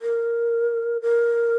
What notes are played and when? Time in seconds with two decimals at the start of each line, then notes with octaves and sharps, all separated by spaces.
0.01 A#4
1.02 A#4